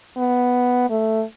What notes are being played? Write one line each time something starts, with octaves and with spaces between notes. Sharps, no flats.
B3
A3